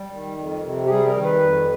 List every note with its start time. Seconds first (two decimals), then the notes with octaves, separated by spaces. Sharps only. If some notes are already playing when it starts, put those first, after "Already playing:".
Already playing: G3
0.12 D#3
0.38 F2
0.64 C3
0.85 G4
0.89 G3 G#4
1.06 A#4
1.16 D#3
1.24 B4
1.42 F2